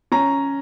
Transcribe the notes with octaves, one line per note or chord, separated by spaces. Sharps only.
C#4 A#5